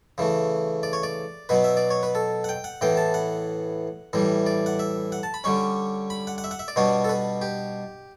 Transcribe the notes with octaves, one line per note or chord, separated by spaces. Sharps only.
C#3 E3 A3
D5
C#5
D5
B2 F#3 B3 B4
E5
D5
C#5
B4
A4
F#5
G5
F#5
A2 E3 B3 G5
A5
F#5
A2 E3 G3
D5
F#5
E5
F#5
A5
B5
D3 G3 C#4 C#6
B5
F#5
F#5
E5
F#5
E5
D5
B2 G3 B3 D4 C#5
A4
B4
G4